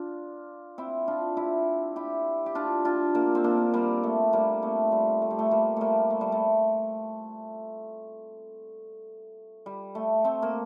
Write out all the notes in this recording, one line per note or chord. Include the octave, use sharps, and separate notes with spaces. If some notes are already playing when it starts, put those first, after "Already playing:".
Already playing: D4 F4
C4 E4
D4 F4
E4 G4
E4 G4
G4
D4 F4
D4 F4
A#3 D4
C4
A#3 D4
G3 A#3
A3
G3 A#3
A3 C4
G3
A3
G3
A3
G3 A#3
G3 A3 A#3
A3
G3
A3
G3
A3
A3 C4
A#3